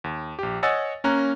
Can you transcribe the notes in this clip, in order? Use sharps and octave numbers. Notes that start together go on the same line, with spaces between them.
D#2
A#1 G4
C#5 D#5 F#5 G#5 E6 A6
A#3 C#4 A#5 F#6